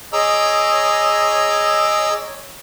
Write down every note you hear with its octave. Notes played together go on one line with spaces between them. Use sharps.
G#4 C#5 D#5 A#5 D6 E6